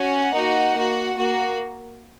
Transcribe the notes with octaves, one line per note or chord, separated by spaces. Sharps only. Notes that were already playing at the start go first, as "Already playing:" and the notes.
Already playing: C#4 F#4 F#5
A#3 D#4 F#4
A#3 F#4
A#3 F#4